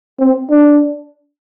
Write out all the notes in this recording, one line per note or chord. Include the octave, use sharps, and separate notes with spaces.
C4
D4